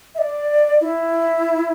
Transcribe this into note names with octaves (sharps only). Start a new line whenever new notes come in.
E5
D5
E4